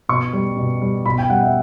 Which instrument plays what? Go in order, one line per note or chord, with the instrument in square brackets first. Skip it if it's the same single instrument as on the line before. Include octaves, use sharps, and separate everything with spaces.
[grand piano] B2 C#6
G3
B2
G3
B2 B5
G5
G3 F#5
E5